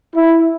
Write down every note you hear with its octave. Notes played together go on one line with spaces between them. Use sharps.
E4